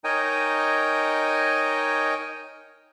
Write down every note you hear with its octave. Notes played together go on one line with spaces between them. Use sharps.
D#4 A#4 C#5 D#5 G5 G#5